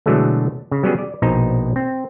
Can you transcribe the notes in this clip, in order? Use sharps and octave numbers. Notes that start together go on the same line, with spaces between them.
B2 D3 E3 F#3 G#3 A3
C#3
F#3 G3 B3 C#4 F#4 G#4
D5
A#1 B2 D#4 C5 A#5
C4